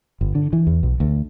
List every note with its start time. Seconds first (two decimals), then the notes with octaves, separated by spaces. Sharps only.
0.21 G1
0.35 D3
0.53 E3
0.67 E2
0.83 B1
1.00 D2